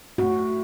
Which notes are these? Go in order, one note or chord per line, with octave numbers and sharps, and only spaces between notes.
A2 A3 F#4